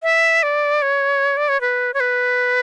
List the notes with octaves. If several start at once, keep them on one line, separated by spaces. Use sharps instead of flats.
E5
D5
C#5
D5
C#5
B4
C#5
B4